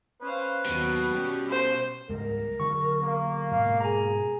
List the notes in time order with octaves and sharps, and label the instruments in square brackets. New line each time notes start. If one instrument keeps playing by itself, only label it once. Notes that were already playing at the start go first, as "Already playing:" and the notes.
[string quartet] C#4 C5 F5 [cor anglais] B4
[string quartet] D#2 F#3 [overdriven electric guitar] B2
[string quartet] G3 C#4 G4
[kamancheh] C5
[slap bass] C#2 G#2 G3 [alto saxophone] A#4
[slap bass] D3 F#3 G#3 [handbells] C#6
[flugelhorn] A#3
[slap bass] G#2 B2 [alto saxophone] F5
[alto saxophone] G#4 [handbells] G#5 A#5